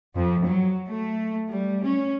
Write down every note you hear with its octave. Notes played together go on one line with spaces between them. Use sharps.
F2
F#3
A3
G3
C#4